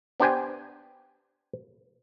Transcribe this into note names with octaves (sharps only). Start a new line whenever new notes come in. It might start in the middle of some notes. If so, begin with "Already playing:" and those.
B3 D4 G4 C5 G5 G#5